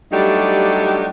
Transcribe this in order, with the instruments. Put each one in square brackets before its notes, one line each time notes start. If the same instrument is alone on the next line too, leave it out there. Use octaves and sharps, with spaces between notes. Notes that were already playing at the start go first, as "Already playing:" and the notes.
[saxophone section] F#3 G3 A3 D4 D#4 G4